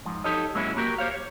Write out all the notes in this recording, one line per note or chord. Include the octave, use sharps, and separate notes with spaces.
G#2 F3
D#4 G4 A4 C#5 D#5
G#2 F#3 G#3 A#3 C#4 E4
A#3 F#4 G4 A#4
G4 C5 C#5 F5
C#5